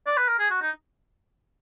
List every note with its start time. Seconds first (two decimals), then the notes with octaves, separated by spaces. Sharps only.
0.07 D5
0.17 B4
0.28 A#4
0.39 G#4
0.50 F#4
0.62 D#4